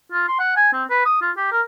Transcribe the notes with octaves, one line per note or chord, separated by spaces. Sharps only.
F4
C6
F#5
G#5
C4
B4
D#6
F4
G4
A#4